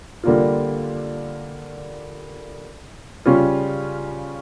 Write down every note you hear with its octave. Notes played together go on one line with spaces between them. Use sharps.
D3 G3 A#3 D4 F4
C#3 G3 C#4 F4